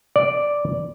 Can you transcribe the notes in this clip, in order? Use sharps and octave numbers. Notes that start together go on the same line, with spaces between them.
D5